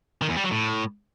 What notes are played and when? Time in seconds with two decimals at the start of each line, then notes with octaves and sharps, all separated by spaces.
0.22 D#3
0.29 E2
0.36 G3
0.44 F#3
0.51 A2